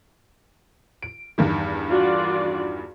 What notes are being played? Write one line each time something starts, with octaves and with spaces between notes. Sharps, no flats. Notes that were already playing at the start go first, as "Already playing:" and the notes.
D7
E2 G2 D#3
F4 F#4 D5